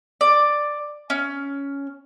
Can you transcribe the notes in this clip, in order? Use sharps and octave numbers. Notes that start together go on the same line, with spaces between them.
D5
C#4